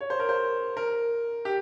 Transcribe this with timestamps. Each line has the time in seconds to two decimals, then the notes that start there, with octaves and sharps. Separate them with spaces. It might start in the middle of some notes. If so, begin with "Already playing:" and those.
0.01 C#5
0.10 C5
0.20 A#4
0.29 C5
0.77 A#4
1.45 G4